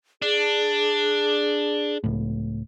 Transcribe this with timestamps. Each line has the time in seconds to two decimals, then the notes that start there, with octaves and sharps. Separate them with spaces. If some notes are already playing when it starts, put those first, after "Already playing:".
0.22 D4 G#4
2.04 C#2 A2